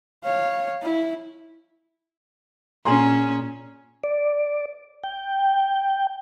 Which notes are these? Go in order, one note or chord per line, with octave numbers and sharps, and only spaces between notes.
C#5 F5
E4
A#2 C#4 G#4 A#5 C6
D5
G5